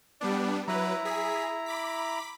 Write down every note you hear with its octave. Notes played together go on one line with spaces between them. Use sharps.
G3 B3 D4 D5
F#3 E4 B4 A#5
G#4 B6
B5 D6 B6